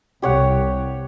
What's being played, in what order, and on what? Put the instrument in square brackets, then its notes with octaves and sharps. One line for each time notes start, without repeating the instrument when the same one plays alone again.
[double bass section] C2 [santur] G4 C#5 F#5